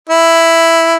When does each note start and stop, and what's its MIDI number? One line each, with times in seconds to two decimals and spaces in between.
0.09 0.96 64